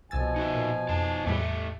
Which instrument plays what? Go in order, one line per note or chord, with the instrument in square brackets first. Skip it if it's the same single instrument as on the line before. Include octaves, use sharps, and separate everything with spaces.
[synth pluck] C2 E6 A6 [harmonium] B2 F3 G#5
[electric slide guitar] D#4 F#4 E5
[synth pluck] A#2
[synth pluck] F2 [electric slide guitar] D#4 C#5 A5
[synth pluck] E2 A2 G3 [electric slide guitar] A3 G4 E5